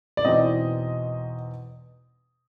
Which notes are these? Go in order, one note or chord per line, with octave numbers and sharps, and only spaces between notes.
D5
E2 B2 G#3 C4 D#4 D#5